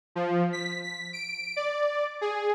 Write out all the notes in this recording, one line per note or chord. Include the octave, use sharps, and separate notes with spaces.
F3
B6
B6
D7
D5
G#4